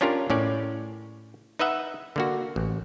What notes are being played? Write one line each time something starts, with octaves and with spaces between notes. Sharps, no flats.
C#4 D4 F4 G4 A#4
A2 C#4 D5
D#4 B4 D#5 E5 F#5
D3 A#3 F#4
A1